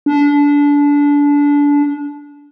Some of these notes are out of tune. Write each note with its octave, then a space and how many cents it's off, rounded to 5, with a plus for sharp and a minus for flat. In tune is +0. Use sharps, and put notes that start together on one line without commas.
D4 -25